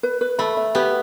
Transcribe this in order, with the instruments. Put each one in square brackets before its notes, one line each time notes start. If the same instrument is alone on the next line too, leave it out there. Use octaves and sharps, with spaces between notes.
[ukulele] B4
B4
[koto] A3 [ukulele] B5
[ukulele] E5
[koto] B3 [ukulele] G4